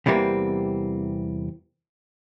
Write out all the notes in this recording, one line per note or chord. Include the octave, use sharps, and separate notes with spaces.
E2 C3 E3 G3 A#3 C4